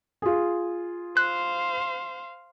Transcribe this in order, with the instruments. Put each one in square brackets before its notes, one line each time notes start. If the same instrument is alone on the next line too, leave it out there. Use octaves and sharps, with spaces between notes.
[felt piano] F4 G#4
[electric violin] C5 F5 [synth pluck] F#6